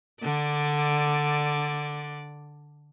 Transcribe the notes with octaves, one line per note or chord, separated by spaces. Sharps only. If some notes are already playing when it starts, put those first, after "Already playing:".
D3 D5